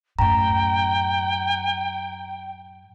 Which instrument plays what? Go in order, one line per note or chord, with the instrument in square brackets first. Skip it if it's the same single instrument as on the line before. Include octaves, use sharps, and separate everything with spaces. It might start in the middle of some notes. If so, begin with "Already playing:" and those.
[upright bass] F#2 A2 [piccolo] G5 [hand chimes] A#5